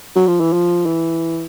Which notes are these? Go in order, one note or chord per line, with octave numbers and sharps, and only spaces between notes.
F#3
F3
E3
F3
E3